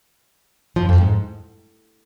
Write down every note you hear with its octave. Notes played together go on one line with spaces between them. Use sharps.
F2 F3
F2 F3
G#2